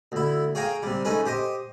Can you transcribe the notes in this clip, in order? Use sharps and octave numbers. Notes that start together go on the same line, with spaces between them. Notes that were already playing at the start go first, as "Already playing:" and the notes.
D2 E4
G#4 C#5 F5 G5 G#5 A#5
C3 G3
A3 C#4 D#4 G#4 B4
G4 C5 D#5